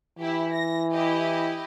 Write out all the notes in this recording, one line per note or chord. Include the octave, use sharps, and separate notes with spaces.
E3 E4 G4
A#6
E4 G4 D#5